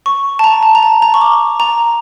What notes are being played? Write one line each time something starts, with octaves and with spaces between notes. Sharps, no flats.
C#6
A5
A#5
A5
A#5
A5
A#5
C#6
D6
A#5